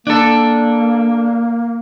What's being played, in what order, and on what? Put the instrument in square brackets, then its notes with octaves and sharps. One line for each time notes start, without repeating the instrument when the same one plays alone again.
[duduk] A#3 [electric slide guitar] D4 A4